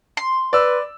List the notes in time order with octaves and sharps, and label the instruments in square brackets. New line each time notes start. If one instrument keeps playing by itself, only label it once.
[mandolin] C6
[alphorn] B4 [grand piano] D5 E6